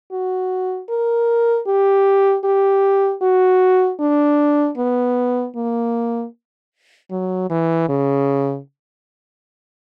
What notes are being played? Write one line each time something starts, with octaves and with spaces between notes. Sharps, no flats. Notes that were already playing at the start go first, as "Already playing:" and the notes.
F#4
A#4
G4
G4
F#4
D4
B3
A#3
F#3
E3
C#3